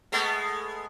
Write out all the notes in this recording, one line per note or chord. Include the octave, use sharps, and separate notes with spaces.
G#3 A3 B3